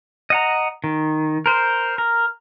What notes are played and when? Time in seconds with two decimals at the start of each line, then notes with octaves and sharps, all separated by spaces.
0.30 D#5 F#5 A#5
0.84 D#3
1.46 A#4 C5
1.98 A#4